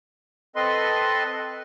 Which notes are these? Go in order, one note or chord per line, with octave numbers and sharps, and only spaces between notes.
C4 A4 B4 D#5 C6